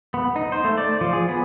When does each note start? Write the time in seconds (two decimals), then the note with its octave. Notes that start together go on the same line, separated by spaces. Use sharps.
0.14 B3
0.36 D#4
0.52 C5
0.64 A3
0.77 D5
1.01 F3
1.13 G#4
1.29 B3